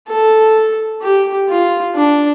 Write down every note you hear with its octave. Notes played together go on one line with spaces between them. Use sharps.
A4
G4
F4
D4